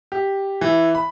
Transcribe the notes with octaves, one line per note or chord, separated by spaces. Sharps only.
G4
E3
B5